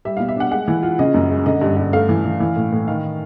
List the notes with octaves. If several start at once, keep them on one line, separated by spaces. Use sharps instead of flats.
G3 E5
B2 F5
E5
D4 F#5
G#3 F#5
E3
F4
C#3 D#5
F#2
G#3
D3 D#5
G2
G2
A3 F5
E3
E3
E3
A2
A2
D#3 F5